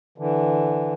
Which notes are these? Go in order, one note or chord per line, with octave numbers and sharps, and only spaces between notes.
D3 E3